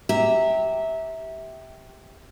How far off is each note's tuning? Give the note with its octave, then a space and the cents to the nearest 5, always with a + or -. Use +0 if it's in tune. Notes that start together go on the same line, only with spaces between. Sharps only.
G4 -5 E5 -20 A#5 -15